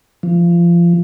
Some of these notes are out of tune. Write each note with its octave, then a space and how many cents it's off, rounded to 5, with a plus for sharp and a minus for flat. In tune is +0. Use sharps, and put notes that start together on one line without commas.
F3 -25